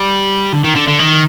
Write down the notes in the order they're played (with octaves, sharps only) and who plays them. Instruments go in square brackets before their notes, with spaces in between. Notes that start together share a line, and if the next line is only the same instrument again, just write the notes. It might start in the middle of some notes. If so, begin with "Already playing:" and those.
Already playing: [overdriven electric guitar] G3
D3
D#3
D3
D3
D#3